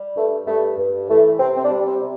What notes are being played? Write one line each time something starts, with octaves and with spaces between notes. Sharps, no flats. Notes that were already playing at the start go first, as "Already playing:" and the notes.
Already playing: G3
G2 A3
G2 A3
G2
E3 A3
C3 C4
C4
D4
G3
C4
C3